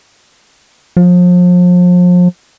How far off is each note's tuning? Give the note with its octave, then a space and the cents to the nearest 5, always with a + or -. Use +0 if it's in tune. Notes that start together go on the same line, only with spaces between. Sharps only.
F3 +35